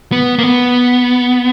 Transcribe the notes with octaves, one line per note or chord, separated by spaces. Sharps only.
B3
A#3
B3